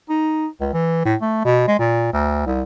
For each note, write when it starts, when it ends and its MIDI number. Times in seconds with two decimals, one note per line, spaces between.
0.09 0.47 63
0.60 0.68 37
0.73 1.00 52
1.05 1.15 45
1.21 1.44 57
1.45 1.65 47
1.68 1.79 56
1.79 2.10 46
2.13 2.42 38
2.46 2.62 36